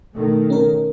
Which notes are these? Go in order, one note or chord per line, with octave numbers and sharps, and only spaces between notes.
B2 D#3 A3
C#4 A#4